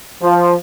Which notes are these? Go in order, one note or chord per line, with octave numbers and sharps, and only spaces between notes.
F3